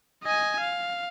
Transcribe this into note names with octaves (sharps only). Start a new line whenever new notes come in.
D#5 G#5
F5